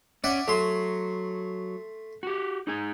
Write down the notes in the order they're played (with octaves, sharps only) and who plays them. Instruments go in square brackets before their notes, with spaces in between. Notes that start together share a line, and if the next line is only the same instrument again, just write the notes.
[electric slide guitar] C#4 [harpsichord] D5 E5 F#5
[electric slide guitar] F#3 [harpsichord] A3 C6
[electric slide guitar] F#4 G4
D#4 G#4 G#5